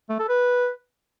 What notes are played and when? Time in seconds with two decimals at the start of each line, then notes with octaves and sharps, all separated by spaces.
0.10 A3
0.19 A4
0.29 B4